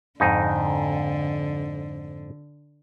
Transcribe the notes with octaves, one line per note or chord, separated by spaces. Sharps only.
F2 G#2 D3 D#4